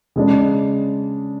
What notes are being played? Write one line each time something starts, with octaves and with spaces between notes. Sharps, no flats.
C#3 G#3 D4